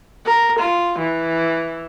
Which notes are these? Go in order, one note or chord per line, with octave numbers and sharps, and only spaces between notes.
A#4
F4
E3